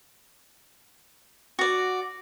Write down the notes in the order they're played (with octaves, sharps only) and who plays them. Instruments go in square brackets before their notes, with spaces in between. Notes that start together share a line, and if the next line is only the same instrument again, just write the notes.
[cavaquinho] F#4 D5